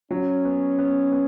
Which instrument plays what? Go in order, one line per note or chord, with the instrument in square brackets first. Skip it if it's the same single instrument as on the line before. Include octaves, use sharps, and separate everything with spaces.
[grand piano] F#3 [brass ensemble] C#4
[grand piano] B3
B3
B3